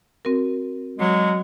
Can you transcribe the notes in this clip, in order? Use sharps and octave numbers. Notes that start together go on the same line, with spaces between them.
C4 F#4 A#4
F#3 G#3